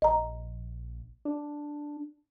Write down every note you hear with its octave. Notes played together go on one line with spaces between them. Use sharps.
A#1 D#5 A#5
D4